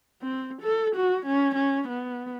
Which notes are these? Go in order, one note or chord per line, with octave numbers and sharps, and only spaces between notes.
C4
A4
F#4
C#4
C#4
B3